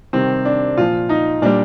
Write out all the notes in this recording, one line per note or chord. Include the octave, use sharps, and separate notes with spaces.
C3 D#3 G3 C4
D4
A#2 F3 F4
D#4
A#2 G3 D4